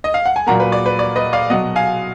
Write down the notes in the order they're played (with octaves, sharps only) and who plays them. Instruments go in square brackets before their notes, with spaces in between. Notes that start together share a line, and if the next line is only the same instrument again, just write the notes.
[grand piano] D#5
F5
F#5
G#5
A#2 F#3 A#3 F#5 A#5
B4
D5
B4
D5
B4 D#5
D5 F5
B2 F#3 B3 D#5 F#5
F5 G#5